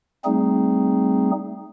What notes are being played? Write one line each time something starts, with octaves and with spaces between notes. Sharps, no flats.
G3 A3 C4 D#4 G#4